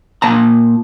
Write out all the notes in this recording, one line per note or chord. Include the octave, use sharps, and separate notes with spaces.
A#2 A5 A#5